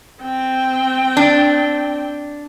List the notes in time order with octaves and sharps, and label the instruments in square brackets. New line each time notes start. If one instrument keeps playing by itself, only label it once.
[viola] C4 G5
[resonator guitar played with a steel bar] D4